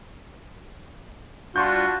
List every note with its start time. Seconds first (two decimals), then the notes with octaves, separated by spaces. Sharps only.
1.56 G3 D4 F4 F#4 C6 C#6 G6